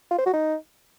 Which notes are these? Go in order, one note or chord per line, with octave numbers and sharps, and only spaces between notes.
F4
C5
F#4
D#4